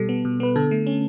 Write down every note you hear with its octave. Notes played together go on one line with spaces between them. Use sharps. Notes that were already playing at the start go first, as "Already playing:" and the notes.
Already playing: B2 G3 A4
B3
B2
B3 B4
D3 A4
A3
C#4